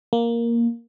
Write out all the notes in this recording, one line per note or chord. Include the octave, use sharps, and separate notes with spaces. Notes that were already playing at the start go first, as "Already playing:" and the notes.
A#3